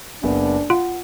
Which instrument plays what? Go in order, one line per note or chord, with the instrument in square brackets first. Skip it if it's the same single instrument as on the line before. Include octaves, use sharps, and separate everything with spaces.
[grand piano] F#1 B3 [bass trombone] D4
[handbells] F4 [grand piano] F#5